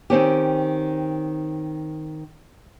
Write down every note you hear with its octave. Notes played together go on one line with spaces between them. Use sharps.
D#3 C4 C#4 G4